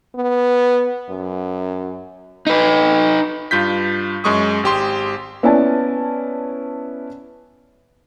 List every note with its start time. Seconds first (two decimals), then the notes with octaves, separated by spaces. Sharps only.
0.15 B3
1.09 F#2
2.47 D#4 B4
3.51 G2 F4 G6 B6
4.24 F#2 G#3 C#6 D#6
4.63 G#1 G4 C6
5.43 B3 C#4 E4 D5 G#5 A5